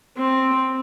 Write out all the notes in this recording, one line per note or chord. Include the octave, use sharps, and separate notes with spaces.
C4